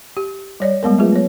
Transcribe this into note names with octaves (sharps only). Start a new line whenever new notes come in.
G4
G3 C#5 D5
G3 G#3 B3 A#4
F#3 A3 F4 G#4 B4
B3 C#5